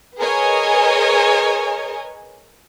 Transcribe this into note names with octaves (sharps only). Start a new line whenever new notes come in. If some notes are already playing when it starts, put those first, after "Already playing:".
G#4 A#4 B4 C#5 D#5 G#5